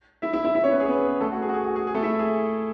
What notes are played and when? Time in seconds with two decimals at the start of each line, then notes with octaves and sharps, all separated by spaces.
0.22 E4 E5
0.33 E4 E5
0.45 E4 E5
0.55 E4 E5
0.63 C#4 C#5
0.71 B3 B4
0.80 G#4
0.88 B3 B4
1.21 A3 A4
1.32 F#4
1.42 G#4
1.49 F#4
1.54 G#4
1.64 F#4
1.76 G#4
1.87 G#4
1.94 A3 A4
2.03 E4 E5
2.19 G#4